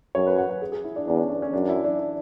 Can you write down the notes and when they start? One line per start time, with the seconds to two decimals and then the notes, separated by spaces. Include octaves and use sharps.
0.15 F#2 C#5
0.26 B4
0.38 F#5
0.50 F#5
0.62 G#4
0.72 G#4
0.84 E4
0.96 D4
1.07 E2 D4
1.19 C#4
1.30 D4
1.42 C#4
1.53 F#2 D4
1.68 E4
1.84 D4
1.99 D4